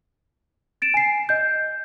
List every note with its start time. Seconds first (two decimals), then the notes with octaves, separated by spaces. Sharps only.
0.82 A6 D7 E7
0.94 G#5 C7
1.29 D#5 G6